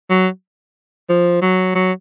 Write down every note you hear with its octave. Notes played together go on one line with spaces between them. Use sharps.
F#3
F3
F#3
F#3